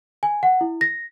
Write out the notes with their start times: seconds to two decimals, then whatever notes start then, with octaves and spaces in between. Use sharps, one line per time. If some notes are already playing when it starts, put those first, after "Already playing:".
0.23 G#5
0.43 F#5
0.61 E4
0.81 A#6